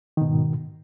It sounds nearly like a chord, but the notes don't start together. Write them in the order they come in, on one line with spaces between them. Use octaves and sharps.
D#3 B2 G#2